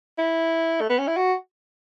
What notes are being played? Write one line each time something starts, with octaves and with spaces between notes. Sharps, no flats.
E4
A3
B3
C#4
E4
F#4